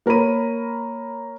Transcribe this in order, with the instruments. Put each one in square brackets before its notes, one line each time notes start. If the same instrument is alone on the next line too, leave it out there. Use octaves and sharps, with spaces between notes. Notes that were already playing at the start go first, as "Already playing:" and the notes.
[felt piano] A#3 A#4 C#5 B5 D#7